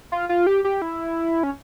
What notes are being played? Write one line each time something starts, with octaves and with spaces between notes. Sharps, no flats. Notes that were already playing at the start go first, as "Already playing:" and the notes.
F4
F4
G4
G4
E4
C#4